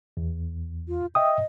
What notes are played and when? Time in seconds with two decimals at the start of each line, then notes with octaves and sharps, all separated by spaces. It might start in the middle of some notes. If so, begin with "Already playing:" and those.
0.17 E2
0.88 F4
1.15 D#5 E5 G5 D#6